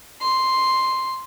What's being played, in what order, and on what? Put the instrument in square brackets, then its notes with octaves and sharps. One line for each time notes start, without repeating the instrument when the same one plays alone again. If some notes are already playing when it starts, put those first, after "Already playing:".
[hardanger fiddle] C6